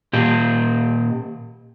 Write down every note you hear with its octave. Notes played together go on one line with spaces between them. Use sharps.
A#2 G4